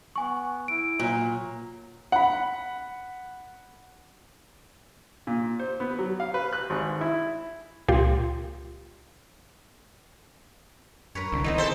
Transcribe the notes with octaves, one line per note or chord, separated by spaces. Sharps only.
B3 G#5 C#6
E4 D7
A#2 F#3
F#5 B5
A#2
C5
B3
F#3
F5
B4
F#6
G#1
E4
C#2 A#2 F4 G4 C6
F#2 A#4 B4 C#5
C2 D3
E3 B3 C4 D#4
G#4 A4 C5 E5